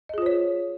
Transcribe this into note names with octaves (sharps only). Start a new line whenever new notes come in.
F4 G#4 C5 C#5 D#5